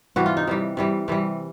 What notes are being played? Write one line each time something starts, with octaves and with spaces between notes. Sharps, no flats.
C3 E3 G3 F#4
F4
D#4
C3 E3 G3
C3 E3 G3
C3 E3 G3